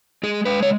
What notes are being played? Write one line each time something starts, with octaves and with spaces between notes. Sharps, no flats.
G#3 G#4
G#3 B4
C#5